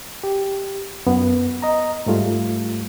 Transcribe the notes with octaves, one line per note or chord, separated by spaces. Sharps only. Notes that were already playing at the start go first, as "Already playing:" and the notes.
G4
F#2 B3
D#5 A#5
G#2 G3 A3 F4